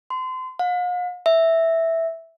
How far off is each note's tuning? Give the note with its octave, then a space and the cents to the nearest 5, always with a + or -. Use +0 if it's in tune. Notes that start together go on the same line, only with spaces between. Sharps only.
C6 -30
F5 +45
E5 -5